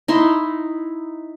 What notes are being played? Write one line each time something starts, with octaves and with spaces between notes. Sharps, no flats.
D#4 E4 C6